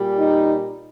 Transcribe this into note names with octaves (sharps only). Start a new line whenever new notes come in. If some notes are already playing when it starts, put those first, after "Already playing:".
Already playing: A#2 G3
D#4